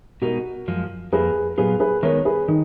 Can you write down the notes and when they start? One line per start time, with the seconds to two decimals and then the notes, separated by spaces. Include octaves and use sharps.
0.22 B2 G#3 D#4 F#4 A#4
0.68 F#2 F3 G#3
1.12 F2 F3 A#3 G#4 B4
1.58 A#2 F#3 B3 F4 G#4 B4
1.80 G#4 B4
2.03 D#3 G#3 B3 D#4 A#4 C#5
2.25 G#4 B4
2.48 D#3 D#4